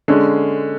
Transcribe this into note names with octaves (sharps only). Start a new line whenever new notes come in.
D3 G#3 C#4